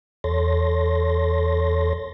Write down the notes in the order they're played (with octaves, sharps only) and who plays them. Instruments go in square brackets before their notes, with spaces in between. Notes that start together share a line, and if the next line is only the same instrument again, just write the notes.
[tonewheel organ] E2 A4 C#5 C6 A6 A#6